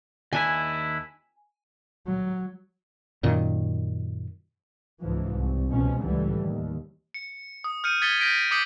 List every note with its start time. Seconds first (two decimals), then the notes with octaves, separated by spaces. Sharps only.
0.33 D#2 D4 E4 G#5
2.06 F#3
3.23 F#2 A#2 D#3
5.01 C#2 G#2 E3 F3
5.34 C2
5.70 C#2 B2 F3 C#4
6.00 C#2 A2 D3 E3 G3
6.39 D#2
7.14 C#7
7.64 D#6
7.84 F6 G6 C#7 D#7
8.01 D#6 G#6 A6 B6 C#7 G7
8.20 F6 G6 A#6 B6 D7 D#7
8.51 D6 D#6 G6 B6 C#7 F#7